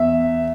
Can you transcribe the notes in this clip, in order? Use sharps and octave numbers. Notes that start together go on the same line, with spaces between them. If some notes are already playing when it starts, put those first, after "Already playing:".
Already playing: E2 E5